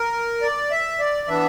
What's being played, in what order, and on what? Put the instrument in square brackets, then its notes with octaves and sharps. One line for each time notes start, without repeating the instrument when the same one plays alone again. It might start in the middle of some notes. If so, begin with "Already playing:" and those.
Already playing: [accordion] A#4
D5
E5
D5
E3 B3 D4 E5